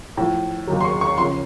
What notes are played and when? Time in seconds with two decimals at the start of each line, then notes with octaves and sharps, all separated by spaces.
0.17 A2 F3
0.67 D#2 D#3 F#3
0.81 C6
0.85 C#6
1.01 C#6
1.18 C#3 F3 C6